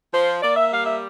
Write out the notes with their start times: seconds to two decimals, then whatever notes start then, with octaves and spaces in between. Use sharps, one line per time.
0.13 F3 C5
0.42 A#3 D5
0.56 E5
0.71 G3 F5
0.85 E5